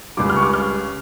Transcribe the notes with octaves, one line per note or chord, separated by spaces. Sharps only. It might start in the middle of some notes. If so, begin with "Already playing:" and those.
C#2 C#3 G3 D6
F6
C#6
D6
F6